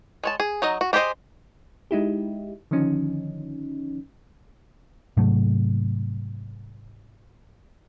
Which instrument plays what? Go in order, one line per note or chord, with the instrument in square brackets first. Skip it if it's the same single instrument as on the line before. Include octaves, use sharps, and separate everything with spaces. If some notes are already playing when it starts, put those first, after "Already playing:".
[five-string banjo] G#3 C#5 A5
G#4
F#3 D#4 D#5
F#4
D4 G4 G#4 C5 D#5
[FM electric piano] G#3 D#4 E4 G4
D3 D#3 F3 C#4 D#4
[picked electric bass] G#2 C3 F#3 A3